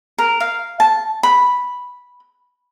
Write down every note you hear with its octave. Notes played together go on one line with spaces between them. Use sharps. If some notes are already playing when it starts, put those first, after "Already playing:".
A#4
F5
A5
B5